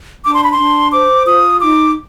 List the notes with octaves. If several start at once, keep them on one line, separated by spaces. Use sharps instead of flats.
D4 D6
C6
B5
C6
D4
C5 D6
F4 D#6
D#4 D6